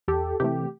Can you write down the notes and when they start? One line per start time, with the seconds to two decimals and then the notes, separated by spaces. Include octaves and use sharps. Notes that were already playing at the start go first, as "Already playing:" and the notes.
0.08 E2 G4 A4
0.40 C3 E3 A3 G4